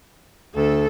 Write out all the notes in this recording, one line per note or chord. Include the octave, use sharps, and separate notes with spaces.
D2 A4